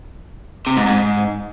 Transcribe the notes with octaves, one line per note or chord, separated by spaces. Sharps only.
C3
G#2
G#2